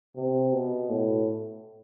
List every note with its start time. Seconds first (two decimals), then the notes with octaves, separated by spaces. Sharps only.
0.16 C3
0.53 B2
0.90 A2